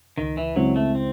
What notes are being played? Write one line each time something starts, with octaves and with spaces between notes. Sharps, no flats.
C#2 D#3
E3
C#3 F#3 G#3 C4 E4
A3
C4